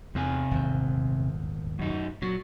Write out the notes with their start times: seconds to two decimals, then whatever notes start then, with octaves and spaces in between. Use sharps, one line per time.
0.15 E2 C3 C4 G#5
0.51 D#1 G#1 E2
1.79 F#2 D#4
2.22 A#2 F#3